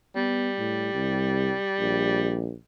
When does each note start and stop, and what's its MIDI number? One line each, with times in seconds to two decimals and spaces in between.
0.16 2.51 55
0.16 0.51 59
0.58 0.94 45
0.94 1.53 36
1.79 2.54 34